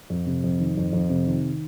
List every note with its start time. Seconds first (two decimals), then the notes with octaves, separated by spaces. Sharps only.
0.10 F2
0.26 C3
0.44 F2
0.60 D#3
0.77 F2
0.93 F2
1.10 C3
1.26 D#3